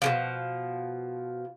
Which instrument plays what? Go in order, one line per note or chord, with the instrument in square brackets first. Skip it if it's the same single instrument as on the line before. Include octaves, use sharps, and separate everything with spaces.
[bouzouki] B2 D3 F3